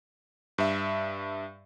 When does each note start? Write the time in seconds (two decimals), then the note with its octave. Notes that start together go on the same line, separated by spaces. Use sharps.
0.58 G2 E5